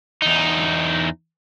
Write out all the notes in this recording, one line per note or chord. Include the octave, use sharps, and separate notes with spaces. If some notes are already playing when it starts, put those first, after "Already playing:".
E2 D#4